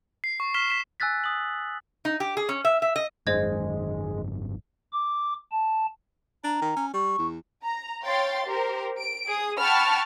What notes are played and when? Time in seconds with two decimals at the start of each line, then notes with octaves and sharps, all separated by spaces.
0.24 C7
0.40 C#6
0.54 C#6 F6 B6 E7 G7
0.70 B6 E7
1.00 G#5 E6 F#6 A6 B6
1.24 D#6 F#7
2.05 D#4
2.20 G4
2.37 G#4
2.49 C#4
2.65 E5
2.82 E5
2.96 D#5
3.27 G#1 F#2 D#3 G#3 C5 D#5 G#6
4.92 D6
5.52 A5
6.44 D4 A#5
6.62 D#3
6.76 C#4
6.94 G3 C#6
7.19 E2
7.63 A#5
8.04 C#5 F5 G5 C6 A6
8.47 G4 A#4 C5
8.99 D7
9.28 G#4 D#6
9.60 F#5 G5 A5 B5 C#6 F6